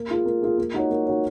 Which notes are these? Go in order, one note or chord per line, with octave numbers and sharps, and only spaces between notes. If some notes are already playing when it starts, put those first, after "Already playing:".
Already playing: A#3
F4 G#4
A#3
F4 G#4
A#3
D#4 F#4 C#5
A#3
D#4 F#4 C#5